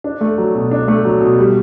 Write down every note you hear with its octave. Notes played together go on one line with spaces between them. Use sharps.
D4
A3
F#3
B2
D4
A3
F#3
B2
G3